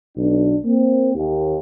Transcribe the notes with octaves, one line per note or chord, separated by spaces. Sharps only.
B1 D4
A#3 C4
D#2